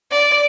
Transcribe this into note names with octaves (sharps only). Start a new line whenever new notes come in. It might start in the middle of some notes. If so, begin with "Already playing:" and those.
D5